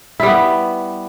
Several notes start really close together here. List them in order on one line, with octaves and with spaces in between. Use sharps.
E4 G3 B3